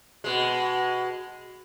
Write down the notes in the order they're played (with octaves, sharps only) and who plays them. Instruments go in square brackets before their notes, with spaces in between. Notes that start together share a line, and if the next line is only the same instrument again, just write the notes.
[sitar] B2 G#3